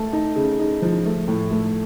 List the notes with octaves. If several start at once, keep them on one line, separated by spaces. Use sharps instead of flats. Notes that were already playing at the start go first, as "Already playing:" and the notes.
Already playing: A3 A5
D#4
C#3
D#4
F3
A3
A2
A3